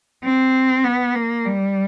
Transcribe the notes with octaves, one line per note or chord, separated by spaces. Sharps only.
C4
B3
A#3
G3